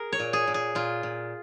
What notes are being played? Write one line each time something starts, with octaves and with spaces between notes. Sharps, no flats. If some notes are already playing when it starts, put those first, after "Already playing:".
Already playing: G#4 A#4
C#5
A#2
G#4
A#2
G#4
A#2 F4
A#2